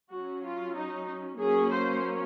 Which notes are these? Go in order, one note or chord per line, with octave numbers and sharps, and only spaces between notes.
F#3 C#4 F#4
F4
D#4
F#3 A#3 C#4 G#4
C5